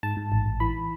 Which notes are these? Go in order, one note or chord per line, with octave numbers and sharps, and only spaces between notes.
G#2 A5
G#2
A1
A1
E3 B5